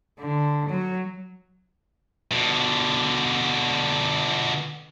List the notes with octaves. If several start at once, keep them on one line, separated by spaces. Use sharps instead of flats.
D3
F#3
B2 D3